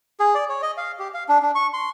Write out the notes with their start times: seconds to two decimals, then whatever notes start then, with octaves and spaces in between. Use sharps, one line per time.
0.20 G#4
0.35 D5
0.49 C#5
0.62 D#5
0.77 F5
0.99 G4
1.14 F5
1.28 D4
1.42 D4
1.55 C#6
1.74 C6